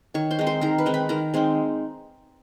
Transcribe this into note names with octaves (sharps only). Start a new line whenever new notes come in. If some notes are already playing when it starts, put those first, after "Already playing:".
D#3 C#5 C#6
C5 C6
G#3 C4 D#4
C5 C6
D#3 A#4 A#5
B4 B5
G#3 C4 D#4
B4 B5
D#3 A#4 A#5
G#3 C4 D#4